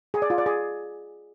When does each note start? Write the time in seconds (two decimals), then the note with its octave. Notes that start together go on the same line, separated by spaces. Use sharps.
0.14 G#4
0.22 D5
0.30 F4
0.38 D5
0.46 G#4